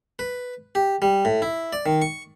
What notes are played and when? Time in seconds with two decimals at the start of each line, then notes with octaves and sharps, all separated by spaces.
0.19 B4
0.75 G4
1.02 G3
1.25 A2
1.42 E4
1.73 D5
1.86 D#3
2.02 C#6